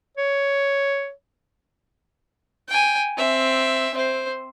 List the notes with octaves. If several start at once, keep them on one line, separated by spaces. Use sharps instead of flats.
C#5
G5 G#5
C4 E5
C4 C5